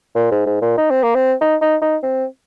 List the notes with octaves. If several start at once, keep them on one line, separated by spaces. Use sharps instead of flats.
A#2
G#2
G#2
A#2
D#4
C4
A#3
C4
D#4
D#4
D#4
C4